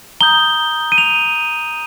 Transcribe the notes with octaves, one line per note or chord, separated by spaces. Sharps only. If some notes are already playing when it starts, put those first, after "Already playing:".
A#5 D#6 G6 G7
D#7
F7